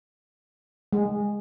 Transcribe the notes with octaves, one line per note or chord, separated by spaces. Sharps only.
G#3